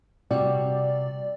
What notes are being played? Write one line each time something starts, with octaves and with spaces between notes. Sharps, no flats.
C3 G3 F#4 D5